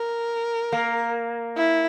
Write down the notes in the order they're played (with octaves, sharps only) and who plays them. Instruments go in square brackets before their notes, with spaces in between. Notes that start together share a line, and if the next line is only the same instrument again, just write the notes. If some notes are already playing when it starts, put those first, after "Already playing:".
Already playing: [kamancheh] A#4
[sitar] A#3
[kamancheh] E4